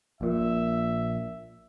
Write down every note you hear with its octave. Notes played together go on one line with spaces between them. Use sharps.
A#1 A#2 E5